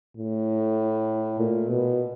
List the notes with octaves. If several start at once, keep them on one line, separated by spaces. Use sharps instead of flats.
A2
A#2
B2